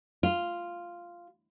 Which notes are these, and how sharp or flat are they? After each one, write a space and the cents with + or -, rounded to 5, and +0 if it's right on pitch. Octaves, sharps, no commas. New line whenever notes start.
F4 -5